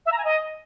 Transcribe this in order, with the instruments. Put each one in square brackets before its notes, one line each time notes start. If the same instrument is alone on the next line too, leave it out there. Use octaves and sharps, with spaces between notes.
[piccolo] E5
A#5
G#5
D#5